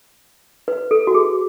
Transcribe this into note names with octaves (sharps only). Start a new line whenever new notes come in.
B4
A4
F#4
G#4